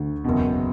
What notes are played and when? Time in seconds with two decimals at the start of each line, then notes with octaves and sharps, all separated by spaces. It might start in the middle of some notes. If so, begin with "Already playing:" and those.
Already playing: D2 D3
0.24 F#1 E2 B2